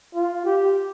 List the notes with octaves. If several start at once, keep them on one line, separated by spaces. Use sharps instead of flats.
F4
G4